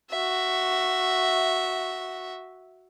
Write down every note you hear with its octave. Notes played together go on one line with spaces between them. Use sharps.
F#4 E5